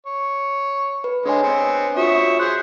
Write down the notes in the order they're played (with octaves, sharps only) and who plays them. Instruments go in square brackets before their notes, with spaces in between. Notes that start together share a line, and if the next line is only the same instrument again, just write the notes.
[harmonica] C#5
[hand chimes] B4
[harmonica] D3 G#3 [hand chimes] D4 C#5 G#5
[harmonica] B3 C4
[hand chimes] F4 F#4 C#5 [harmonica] E5 C#6 D#6
[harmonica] G#4 C5 [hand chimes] F#6 G6